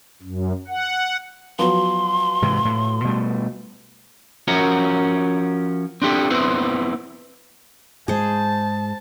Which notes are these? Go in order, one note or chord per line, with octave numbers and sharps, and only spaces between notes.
F#2
F#5
F3 F#3 B3 C6
G#2 C3 E3
A2
B2 G3 A3
F3 C#4 F#4 A#4
C4 D4 G4 A4
B3 C4 E4 B4 C5
G#2 G#3 G#4 C5 A5